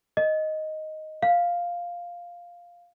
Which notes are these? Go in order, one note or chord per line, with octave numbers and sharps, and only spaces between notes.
D#5
F5